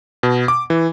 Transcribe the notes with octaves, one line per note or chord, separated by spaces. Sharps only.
B2
D6
E3